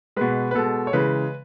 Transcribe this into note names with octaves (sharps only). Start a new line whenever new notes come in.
B2 G#3 B4
B4
B2 G#3 A4
C#5
C#3 E3 G#3 B4